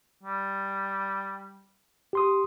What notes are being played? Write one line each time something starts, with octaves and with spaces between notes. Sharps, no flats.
G3
G4 C6 D#6